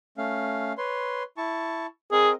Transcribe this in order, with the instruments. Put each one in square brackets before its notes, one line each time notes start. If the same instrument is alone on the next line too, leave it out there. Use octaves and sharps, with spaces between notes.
[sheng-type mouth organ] A3 C#4 F5
B4 C#5 C6
E4 A5 C#6
[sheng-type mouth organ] C4 A#4 D#5 [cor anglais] G#4